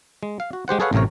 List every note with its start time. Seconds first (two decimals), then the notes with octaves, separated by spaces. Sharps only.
0.23 G#3
0.40 F5
0.53 F#4
0.68 G#3 G4 C5 F#5
0.80 G#4 A4 B4 C#5 F5 F#5
0.93 A1 A2 C3 A#4 C#5